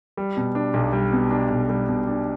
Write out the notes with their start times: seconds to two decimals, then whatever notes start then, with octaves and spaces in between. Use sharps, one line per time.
0.17 G3
0.37 B2
0.55 D4
0.74 B1
0.93 G3
1.13 B2
1.31 D4
1.50 B1
1.69 G3
1.88 B2
2.07 D4